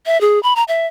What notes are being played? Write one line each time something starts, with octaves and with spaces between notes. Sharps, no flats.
E5
G#4
B5
A#5
E5